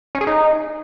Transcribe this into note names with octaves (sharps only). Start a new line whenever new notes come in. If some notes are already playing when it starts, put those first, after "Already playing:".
C#4
G#4
D#4